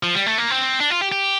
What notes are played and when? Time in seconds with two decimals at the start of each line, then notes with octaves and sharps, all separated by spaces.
0.03 F3
0.15 G3
0.26 A3
0.38 A#3
0.50 C4
0.80 D4
0.90 F4
1.01 G4
1.12 G4